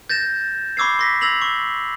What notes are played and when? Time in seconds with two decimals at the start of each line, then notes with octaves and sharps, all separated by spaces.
0.10 G6 A6 A#6 E7
0.77 B5 C#6 D6 E6 G#6 C7
0.99 C6 A#6 B6
1.21 E6 G#6 A#6 F7 F#7
1.42 C#6